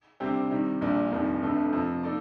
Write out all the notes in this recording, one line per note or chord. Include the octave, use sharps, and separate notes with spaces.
D2 C3 G3 C4 G4
C3 D#3 G3
A#1 A#2 G3 D4
F1 F2 D#3 G3
G1 F2 D3 A3
F2 C3 F3
A#3 D#4 A4 D5